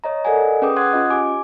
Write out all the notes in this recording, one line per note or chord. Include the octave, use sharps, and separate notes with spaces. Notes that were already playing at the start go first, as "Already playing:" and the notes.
C#5 D#5 A#5
A4 A#4 D5 D#5 F#5 G#5
C#4 G#4 B4 G5 D6 D#6
F#5 C6 D#6 F#6 G#6
C#4 F4 D#5
G4 G#5 D6